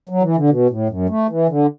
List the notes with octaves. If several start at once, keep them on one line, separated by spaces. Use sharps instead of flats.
F#3
E3
D3
B2
A2
F#2
A3
E3
D3